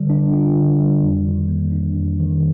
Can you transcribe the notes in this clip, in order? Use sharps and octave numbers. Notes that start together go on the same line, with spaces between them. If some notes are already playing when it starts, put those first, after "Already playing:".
Already playing: D3 G3
D4
F4
D3
G3
F2
D#3
A#3
D4
F2
D#3